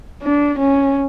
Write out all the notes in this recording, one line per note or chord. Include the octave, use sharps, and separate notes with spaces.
D4
C#4